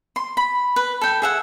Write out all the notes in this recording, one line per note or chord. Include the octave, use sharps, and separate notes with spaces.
C6
B5
B4
A4 G5
G#4 E5 F#5